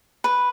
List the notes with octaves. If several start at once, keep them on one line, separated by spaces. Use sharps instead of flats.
B4